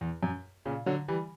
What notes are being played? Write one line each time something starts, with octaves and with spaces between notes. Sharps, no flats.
E2
F#2
A#2 C#3
D3 F#3
E3 G3